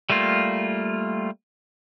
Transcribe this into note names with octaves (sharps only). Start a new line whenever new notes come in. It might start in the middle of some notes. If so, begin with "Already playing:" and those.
G3 A3 A#3 F4